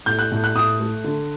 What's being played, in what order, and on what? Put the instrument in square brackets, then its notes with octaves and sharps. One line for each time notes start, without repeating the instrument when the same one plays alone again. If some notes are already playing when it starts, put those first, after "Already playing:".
[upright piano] A2 G6
F#6
A2
F#6
A2 D#6
A3
D3